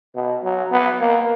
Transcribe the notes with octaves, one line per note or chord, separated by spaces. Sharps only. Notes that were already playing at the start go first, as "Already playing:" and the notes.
B2
F#3
B3
A#3